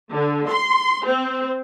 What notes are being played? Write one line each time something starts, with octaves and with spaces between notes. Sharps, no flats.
D3
C6
C4